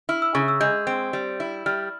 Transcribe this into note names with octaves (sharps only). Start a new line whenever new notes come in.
E4 F6
E6
C#3 C#6
E6
G#3 G6
C4
G3
E4
G3 F6